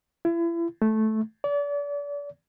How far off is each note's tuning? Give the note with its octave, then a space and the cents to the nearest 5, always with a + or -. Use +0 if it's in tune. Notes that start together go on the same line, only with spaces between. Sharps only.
E4 +35
A3 -10
D5 -35